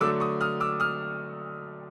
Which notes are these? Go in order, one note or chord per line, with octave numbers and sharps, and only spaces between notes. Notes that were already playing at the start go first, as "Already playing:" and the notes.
D3 F#3 A3 D6 E6
C#6 D#6
D#6 F6
D6 E6
D#6 F6